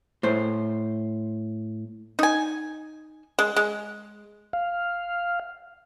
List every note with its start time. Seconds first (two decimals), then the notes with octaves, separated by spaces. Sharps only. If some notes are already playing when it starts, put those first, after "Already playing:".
0.23 A2 C5
2.19 D#4 G#5
3.39 G#3
3.56 G#3
4.53 F5